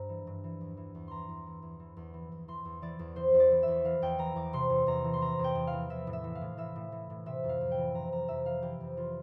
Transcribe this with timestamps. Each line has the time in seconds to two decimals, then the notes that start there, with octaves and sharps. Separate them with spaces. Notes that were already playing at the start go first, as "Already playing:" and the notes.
Already playing: G2 C5 A#5
0.09 E3
0.27 G2
0.44 E3
0.61 E2
0.77 E3
0.95 E2
1.08 E3 A#5 C6
1.29 E2
1.46 E3
1.62 E2
1.80 E3
1.97 E2
2.14 E3
2.32 E2
2.48 E3 C6
2.65 E2
2.82 E3 D5
2.99 E2
3.16 E3 C5
3.34 E2
3.40 D5
3.51 E3
3.63 E5
3.68 E2
3.84 E3 F5
4.02 E2 G5
4.19 E3 A#5
4.36 E2 D6
4.53 C3 C6
4.70 E2
4.87 E2 A#5
5.04 E3
5.13 C6
5.21 C3 A#5
5.39 E2
5.44 G5
5.55 E2
5.67 F5
5.73 E3
5.90 E3 E5
6.07 A2
6.13 E5
6.24 E3
6.35 F5
6.41 A2
6.58 E3 E5
6.76 A2
6.92 E3
7.10 A2
7.26 C3 E5
7.44 F2
7.49 F5
7.61 F2
7.71 G5
7.78 E3
7.95 C3 A#5
8.12 F2 A#5
8.28 F2 E5
8.45 E3 F5
8.62 E3 G4
8.80 F2
8.97 E3 F4